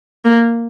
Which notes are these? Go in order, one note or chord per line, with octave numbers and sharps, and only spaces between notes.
A#3